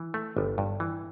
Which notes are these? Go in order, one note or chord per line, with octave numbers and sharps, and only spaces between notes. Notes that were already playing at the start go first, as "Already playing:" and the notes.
Already playing: E3
A3
G1
G2
E3